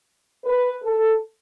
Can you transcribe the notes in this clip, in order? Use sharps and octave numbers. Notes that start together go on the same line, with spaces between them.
B4
A4